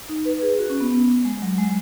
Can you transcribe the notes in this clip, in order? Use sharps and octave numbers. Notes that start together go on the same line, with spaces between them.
D#4
B4
G#4
F#4
C#4
B3
G#3
F#3
G#3